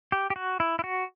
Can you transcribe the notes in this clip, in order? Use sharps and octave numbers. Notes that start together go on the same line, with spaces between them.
G4
G4
F#4
E4
E4
F#4